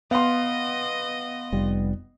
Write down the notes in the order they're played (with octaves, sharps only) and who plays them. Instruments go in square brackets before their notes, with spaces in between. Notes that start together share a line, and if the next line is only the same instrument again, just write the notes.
[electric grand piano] B3 [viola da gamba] D#5 [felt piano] F5 C6
[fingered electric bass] F1 G3